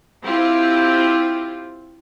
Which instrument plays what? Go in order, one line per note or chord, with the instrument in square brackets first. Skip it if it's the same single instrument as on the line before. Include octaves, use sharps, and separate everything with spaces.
[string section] C4 E4 F4 G4